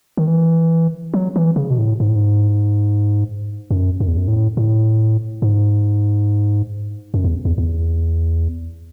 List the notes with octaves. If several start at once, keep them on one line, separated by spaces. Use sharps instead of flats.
D#3
E3
F#3
E3
C#3
B2
A2
G#2
A2
G#2
F#2
F#2
E2
F#2
A2
A2
G#2
F#2
E2
E2
E2